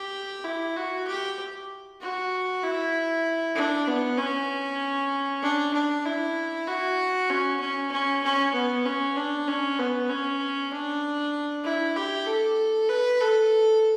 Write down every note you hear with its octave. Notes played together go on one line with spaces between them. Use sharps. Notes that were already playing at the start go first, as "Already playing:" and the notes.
Already playing: G4
E4
F#4
G4
F#4
E4
D4
B3
C#4
D4
D4
E4
F#4
C#4
C#4
C#4
C#4
B3
C#4
D4
C#4
B3
C#4
D4
E4
G4
A4
B4
A4